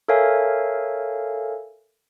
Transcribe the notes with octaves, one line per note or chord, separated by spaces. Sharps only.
A4 A#4 C#5 E5 F5 G#5